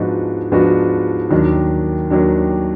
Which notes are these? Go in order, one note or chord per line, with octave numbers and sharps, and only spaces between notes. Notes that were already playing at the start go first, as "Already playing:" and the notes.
Already playing: G#2 F3 B3 D4 F#4
G#2 F3 B3 D4 F#4
D#2 D#3 F#3 D4
D#2 D#3 F#3 D4